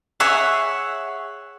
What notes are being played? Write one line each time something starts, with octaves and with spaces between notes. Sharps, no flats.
G#4 C#5 E5 F#5